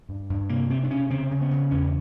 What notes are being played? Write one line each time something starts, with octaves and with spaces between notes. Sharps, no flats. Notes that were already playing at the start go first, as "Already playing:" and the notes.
G2
G2
C3 A#3
C3 C4
D4
C3 C#4
C#3 C4
C#3
B3
C#3
E2 C#4